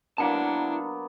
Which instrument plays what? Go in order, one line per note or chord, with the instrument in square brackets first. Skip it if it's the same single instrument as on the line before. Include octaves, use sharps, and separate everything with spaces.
[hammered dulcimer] F#3 A#3 B3 [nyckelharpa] D4 [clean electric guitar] E4 F#5 A5